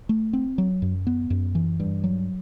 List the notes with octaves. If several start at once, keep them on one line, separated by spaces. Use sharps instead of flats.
A3
C4
F#3
F#2
B3
F#2
E3
G2
F#3